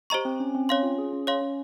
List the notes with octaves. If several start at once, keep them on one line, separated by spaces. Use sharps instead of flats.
G4 C5 D#5 A#5 C#6
C4
C#4
C4
C#4 C#5 F5 C6
F4
G#4
C#4
C#5 F5 C6
C#4